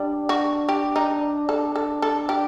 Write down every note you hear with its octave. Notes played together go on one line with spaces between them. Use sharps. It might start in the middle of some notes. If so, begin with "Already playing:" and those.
Already playing: G3 D4
F#4
G4
D#4
D4 A4
A4
A4
G4